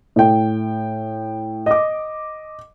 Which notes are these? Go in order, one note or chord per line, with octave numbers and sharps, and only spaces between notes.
A2 G5
D#5 D6